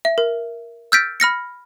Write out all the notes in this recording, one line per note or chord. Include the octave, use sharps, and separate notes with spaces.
E5
A#4
E6 F6 G6 A6 B6 D7
B5 F6 A#6 C#7